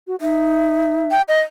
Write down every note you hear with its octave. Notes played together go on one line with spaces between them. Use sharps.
F#4
D#4 E5
G5
D#5